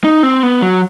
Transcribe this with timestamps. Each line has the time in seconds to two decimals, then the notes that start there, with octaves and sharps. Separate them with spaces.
0.04 D#4
0.23 C4
0.43 B3
0.62 F#3